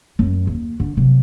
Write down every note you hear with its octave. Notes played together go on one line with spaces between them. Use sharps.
F#2
D#2
D3
C3 F#3